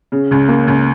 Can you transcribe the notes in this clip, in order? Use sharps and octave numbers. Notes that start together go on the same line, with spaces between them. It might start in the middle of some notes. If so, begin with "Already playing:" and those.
C#3
C#2
A#3
C#2